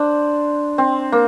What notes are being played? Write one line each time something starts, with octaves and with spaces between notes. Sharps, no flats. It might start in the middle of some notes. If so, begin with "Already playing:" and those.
Already playing: D4 C5
C4
A#3